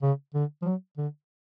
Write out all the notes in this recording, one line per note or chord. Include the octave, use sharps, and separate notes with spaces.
C#3
D3
F3
F#3
D3